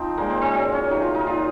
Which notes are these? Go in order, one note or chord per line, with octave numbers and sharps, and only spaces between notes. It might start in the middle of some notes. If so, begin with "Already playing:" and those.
Already playing: F3 C4 D#4
A#2 G#3 A#3
C4
C4
A#2 F#3 C#4
C#4
C3 F#3 D#4
F4
D#4
A#2 F#3 F4